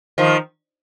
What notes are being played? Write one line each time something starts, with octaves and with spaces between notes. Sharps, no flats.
D#3 F3